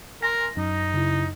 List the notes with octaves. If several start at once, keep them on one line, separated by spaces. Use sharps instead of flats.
A#4 G#5 C6 A#6
F#2 D#4
C#3 E4